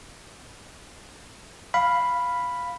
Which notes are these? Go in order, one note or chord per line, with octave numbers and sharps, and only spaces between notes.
F5 B5